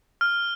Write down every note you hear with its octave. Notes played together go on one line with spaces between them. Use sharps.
F6